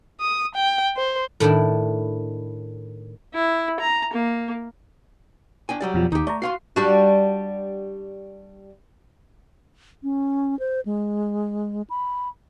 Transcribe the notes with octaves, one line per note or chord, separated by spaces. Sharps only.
D#6
G5
C5
A2 D#3 D4 E4
E4
A#5
A#3
D4 G5 G#5
F#3 G3 D5
F2 B2 F3
D#2 D#4 G4
A3 D5 A#5
F#4 F5 C6 C7
G3 D4 F#4
C#4
C5
G#3
B5